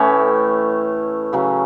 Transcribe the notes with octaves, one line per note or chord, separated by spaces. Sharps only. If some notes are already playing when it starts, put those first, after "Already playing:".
Already playing: A2 E3 A3 C#4
C#3 F#3 C#4